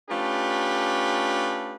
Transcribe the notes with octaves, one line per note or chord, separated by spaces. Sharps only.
A3 C#4 D4 F4 G4 B4